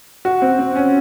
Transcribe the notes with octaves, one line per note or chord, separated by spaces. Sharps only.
F#4
C4
C4
C#4